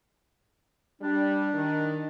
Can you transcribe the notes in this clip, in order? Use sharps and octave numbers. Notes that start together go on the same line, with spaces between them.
G3 D4
D#3